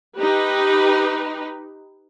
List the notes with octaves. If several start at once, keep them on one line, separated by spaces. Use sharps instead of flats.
D#4 G4 B4